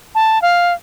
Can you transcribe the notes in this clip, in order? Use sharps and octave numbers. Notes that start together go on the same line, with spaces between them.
A5
F5